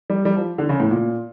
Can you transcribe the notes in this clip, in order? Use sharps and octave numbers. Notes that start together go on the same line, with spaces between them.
G3
G3
F3
D3
C#3
A2
A#2